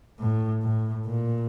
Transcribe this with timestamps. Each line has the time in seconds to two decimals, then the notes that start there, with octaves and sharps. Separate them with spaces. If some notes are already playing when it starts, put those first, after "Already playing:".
0.19 A2
0.63 A2
1.06 A#2